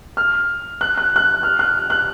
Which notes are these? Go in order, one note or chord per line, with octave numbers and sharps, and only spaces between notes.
F6
F#6
F#6
F#6
F6
F#6
F#6